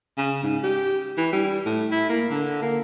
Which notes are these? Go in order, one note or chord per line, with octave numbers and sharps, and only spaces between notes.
C#3
G#2
G4
E3
G3
A2
E4
A#3
D3
A#3